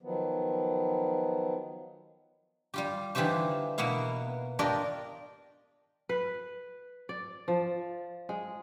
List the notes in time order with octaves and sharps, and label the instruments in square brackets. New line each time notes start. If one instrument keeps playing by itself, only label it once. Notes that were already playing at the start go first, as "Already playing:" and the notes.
[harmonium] D#3 F3 F#3 B3
[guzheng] G3 F4 G4
D3 E3 D#4 F4 G4 C5
B2 A#3 B3 E4 F5
D4 F4 G4 A#4 D5 D#5
[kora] B4
D5
F3
G#3